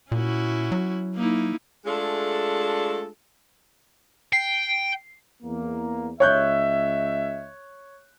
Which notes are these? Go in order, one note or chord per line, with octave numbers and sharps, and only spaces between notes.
A#2 C#4 E4 F#4
F#3
A#3 D#4 E4
G#3 A3 D4 F4 G#4 A4
G5 C7
E2 A#3
C#2 C#5 D#5 E5 F#6 G6